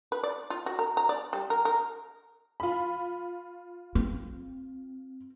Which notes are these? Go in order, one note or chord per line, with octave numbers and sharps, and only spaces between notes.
B4
D5
F4
F#4
A#4
A#5
D5
G3
A#4
A#4
F4 B5
C4